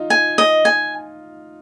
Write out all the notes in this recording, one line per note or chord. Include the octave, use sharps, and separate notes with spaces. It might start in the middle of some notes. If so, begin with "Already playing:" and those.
Already playing: D#4 F4
G#5
D#5
G#5